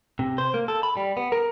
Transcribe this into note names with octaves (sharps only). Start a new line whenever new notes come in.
C3
C5
A#3
A4
B5
G3
B3
A#4